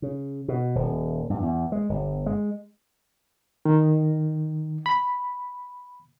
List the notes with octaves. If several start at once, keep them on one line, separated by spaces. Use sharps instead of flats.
C#3
B2
D#1
G2
E2
G#3
G1
G#3
D#3
B5